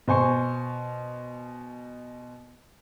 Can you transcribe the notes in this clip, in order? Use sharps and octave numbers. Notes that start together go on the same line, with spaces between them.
B2 C5 G#5 C#6